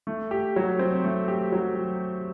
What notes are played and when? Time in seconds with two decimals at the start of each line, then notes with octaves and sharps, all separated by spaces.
0.07 A3
0.31 G4
0.56 F#3
0.79 C4
1.04 A3
1.28 G4
1.52 F#3